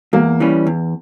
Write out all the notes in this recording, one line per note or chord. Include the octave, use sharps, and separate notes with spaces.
E2 A#3
E3 G3 C#4
E2